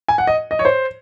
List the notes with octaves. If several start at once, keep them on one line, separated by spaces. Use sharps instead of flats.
G#5
F#5
D#5
D#5
C#5
C5